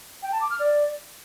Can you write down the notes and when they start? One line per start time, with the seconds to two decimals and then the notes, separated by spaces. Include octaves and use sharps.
0.23 G5
0.32 A5
0.41 D6
0.50 F6
0.60 D5